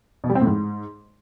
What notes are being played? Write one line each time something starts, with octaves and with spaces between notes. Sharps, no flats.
B2
G3
C4
A2
G#2